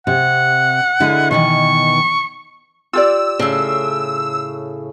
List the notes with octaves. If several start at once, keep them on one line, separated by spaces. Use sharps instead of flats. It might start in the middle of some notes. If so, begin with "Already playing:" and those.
C3 F#5
D3 G#3 E4
B2 D#3 E3 C#6
F4 G4 D5 E6
A2 C#3